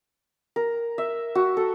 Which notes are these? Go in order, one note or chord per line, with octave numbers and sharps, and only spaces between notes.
A#4
E5
F#4
A4